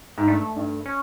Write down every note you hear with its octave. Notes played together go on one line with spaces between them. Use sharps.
G#2
G2 A3
G2
C#4